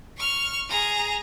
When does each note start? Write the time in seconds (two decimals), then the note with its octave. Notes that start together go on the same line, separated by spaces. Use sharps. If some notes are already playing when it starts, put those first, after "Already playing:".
0.17 C#6 F6
0.69 G#4 A#5